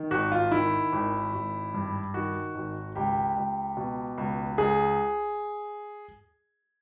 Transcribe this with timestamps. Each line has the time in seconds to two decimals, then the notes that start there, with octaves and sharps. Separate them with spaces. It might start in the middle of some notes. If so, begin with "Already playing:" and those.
Already playing: D#3
0.11 G#1 F#4
0.32 F4
0.52 D#3 E4
0.92 G#1
1.34 G#1
1.74 G2
2.14 D#3 F#4
2.55 G#1
2.96 C#2 G4
3.36 C#2
3.77 B2
4.18 C#2
4.58 C#2 G#4